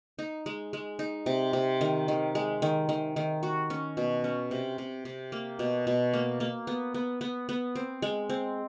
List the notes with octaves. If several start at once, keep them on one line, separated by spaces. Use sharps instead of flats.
D#4
G#3
G#3
D#4
C3
C3
D#3
D#3
G#3
D#3
D#3
D#3
F#4
C#4
B2
C#4
C3
C3
C3
A#3
B2
B2
A#3
A#3
B3
B3
B3
B3
C4
G#3
C4